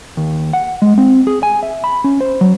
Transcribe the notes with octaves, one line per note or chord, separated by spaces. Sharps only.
D#2
F#5
G#3
C4
G#4
G#5
E5
B5
C#4
C5
F#3